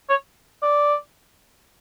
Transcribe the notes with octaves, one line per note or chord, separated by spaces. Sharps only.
C#5
D5